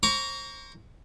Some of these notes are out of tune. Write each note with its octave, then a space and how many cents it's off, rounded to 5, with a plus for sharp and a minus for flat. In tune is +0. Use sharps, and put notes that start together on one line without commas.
C5 +25 A#5 +0 C#6 +35